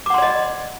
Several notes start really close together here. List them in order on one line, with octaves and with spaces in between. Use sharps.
D6 F#5 C6 D5 D#5